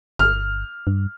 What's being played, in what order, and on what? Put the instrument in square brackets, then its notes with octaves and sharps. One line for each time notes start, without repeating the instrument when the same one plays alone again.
[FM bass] G1 [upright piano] F6
[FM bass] G2